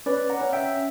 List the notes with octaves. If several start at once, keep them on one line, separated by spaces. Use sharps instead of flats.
C#4 B4 D5
F#5 A#5
C#4
E5 G5